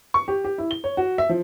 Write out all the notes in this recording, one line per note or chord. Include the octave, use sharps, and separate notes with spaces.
C#6
G4
G4
E4
G7
C#5
F#4
E5
F3